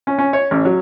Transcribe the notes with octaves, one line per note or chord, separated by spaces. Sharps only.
C#4
C#4
C#5
A1
F#3